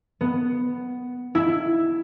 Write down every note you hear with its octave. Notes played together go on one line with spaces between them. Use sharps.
B3
E4